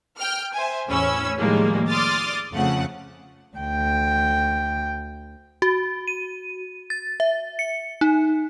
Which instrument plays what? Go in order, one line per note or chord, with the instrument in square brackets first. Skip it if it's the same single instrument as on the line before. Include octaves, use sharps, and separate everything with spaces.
[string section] G5 F6
C5 E5 G#5
E2 A2 C#4 B5 E6
A2 D#3 F3 G3 G#3 A#3
D5 C6 D6 D#6 F6 A6
F2 C#3 A3 F#5
[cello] D2 G5
[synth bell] F#4
D#7
A6
E5
C#7
D#4